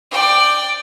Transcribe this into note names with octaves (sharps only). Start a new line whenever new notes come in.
D5 G5